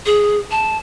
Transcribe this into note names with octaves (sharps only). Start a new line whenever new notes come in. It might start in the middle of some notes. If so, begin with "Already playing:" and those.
G#4
A5